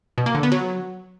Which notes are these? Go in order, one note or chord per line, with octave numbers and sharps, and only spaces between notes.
B2
A#3
D3
B3
F#3